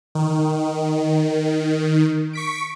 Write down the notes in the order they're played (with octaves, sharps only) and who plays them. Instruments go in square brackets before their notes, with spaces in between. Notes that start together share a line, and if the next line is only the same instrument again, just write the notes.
[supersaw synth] D#3
C#6 B6 D7